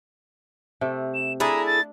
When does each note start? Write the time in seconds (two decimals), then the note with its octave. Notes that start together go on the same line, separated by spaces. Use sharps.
0.81 C3 A3
1.14 E7
1.40 D4 E4 G#4 A4 A#5
1.67 A6